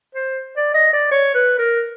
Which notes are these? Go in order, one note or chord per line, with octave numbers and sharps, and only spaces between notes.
C5
D5
D#5
D5
C#5
B4
A#4